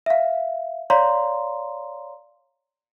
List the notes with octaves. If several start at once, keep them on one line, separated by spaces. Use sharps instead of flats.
E5 F5
C#5 D5 F5 A#5 C6